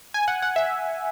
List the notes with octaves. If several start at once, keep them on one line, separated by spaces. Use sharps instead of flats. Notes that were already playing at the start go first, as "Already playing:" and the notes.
G#5
F#5
F#5
E5